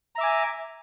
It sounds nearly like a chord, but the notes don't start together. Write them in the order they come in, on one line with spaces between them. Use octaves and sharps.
A#5 E5 D6 G#5